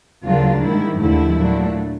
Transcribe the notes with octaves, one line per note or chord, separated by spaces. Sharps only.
D2 C#3 F#3 A#3 D4 F4
G#2 D#3 G3 E4
D#2 D3 F3 A3 E4
A#2 F#3 A3 D4